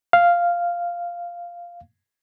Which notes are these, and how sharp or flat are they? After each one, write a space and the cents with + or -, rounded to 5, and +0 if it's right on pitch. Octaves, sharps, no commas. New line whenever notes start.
F5 -5